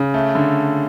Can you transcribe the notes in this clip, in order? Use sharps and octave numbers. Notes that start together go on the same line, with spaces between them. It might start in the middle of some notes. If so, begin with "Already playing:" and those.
Already playing: C#3
A3
D3